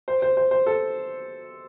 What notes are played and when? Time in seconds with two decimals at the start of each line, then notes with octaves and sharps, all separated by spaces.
0.08 C5
0.22 C5
0.37 C5
0.51 C5
0.66 A4